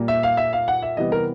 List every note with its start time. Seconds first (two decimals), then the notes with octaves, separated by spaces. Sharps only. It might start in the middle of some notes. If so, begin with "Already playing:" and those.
Already playing: A#2 G3 A#3
0.08 E5
0.23 F5
0.37 E5
0.53 F5
0.68 F#5
0.82 E5
0.97 C3 E3 G3 B3 D#5
1.12 A#4